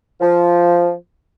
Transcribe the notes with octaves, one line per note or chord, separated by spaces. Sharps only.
F3